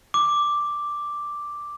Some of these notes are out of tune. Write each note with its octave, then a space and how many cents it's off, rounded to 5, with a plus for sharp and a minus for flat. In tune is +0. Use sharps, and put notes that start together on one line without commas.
D6 +0